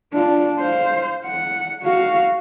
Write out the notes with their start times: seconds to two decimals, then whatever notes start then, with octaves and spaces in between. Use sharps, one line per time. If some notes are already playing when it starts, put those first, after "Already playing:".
0.13 D4 F4
0.59 C5 F5
1.25 F#5
1.83 F#4 F5